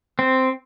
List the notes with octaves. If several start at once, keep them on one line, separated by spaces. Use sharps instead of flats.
C4